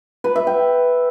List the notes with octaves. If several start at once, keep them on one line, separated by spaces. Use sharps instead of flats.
B4
E5
G5